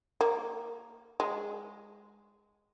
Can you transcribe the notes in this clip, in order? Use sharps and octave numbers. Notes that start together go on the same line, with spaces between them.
A#3
G#3